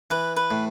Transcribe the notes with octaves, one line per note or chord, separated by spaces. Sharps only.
E3 B4
B4
A2